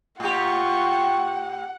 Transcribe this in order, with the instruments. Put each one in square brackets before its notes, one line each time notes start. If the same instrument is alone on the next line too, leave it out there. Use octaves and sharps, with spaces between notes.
[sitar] A2 G4 [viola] F4 C#6 [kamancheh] F#5